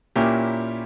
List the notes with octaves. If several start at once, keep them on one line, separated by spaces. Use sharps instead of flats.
A#2 A#3 C#4 E4 G4